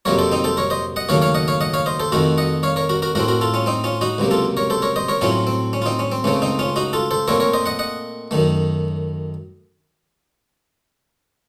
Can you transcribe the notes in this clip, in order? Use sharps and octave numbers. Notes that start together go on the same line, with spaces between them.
F2 C3 F#3 A#3 A#4 C#5
A4 C5
C4 D#4
A4 C5
A#4 C#5
C5 D#5
D#5 F#5
D#2 C#3 F#3 A3 C#5 F5
C#5 F5
D#5 F#5
C#5 F5
D#5 F#5
C#5 F5
C5 D#5
A4 C5
F2 D#3 A3 F#4 A#4
D#5 F#5
C#5 F5
A#4 C#5
F#4 A#4
F#4 A#4
A2 A3 C4 F#4 A#4
F#4 A#4
F4 A4
C#4 F4
C4 D#4
C#4 F4
D#4 F#4
C#2 C3 F#3 A#3
F4 A4
A#4 C#5
A4 C5
A#4 C#5
C5 D#5
A#4 C#5
A2 F#3 A3 C4 C#4 F4
C4
C#4
F4
C4 D#4
C#4
C4
C#2 C#3 A3 C4 C#4
C4 D#4
C#4 F4
D#4 F#4
F4 A4
A4 C5
A#2 A3 C4 A#4 C#5
A#4 C#5
C5 D#5
D#5 F#5
D#5 F#5
F#2 D#3 A3